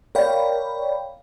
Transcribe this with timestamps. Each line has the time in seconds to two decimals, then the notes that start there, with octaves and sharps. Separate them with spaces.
0.15 A#4 C#5 D5 F5 G5 B5